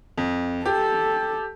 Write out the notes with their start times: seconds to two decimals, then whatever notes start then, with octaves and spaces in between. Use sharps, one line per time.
0.18 F2
0.66 G4 A4